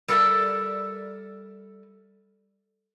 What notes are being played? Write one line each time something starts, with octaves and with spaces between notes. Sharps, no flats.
G3 A4 A#4 C#5 D5 E5